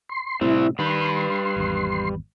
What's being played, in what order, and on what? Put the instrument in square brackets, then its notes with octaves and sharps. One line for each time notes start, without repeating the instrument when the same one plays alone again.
[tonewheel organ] C6
[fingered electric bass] A2 C3 [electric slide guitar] G3 C4 [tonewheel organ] E4
[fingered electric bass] D#3 [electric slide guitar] G3 B4 [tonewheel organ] C6
[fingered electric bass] G#1 E2